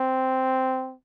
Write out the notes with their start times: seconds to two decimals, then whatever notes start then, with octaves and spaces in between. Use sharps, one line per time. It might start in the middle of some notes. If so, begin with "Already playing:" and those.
Already playing: C4